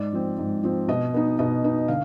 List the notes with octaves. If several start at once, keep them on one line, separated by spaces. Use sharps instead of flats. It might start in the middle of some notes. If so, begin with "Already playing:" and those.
Already playing: G#2 D5
F3 C4
G#2
F3 C4
B2 D#5
B3 D#4
B2 D#5
B3 D#4
D3 F5